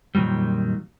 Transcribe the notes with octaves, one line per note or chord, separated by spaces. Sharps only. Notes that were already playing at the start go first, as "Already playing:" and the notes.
F2 A#2 D#3 F#3 G3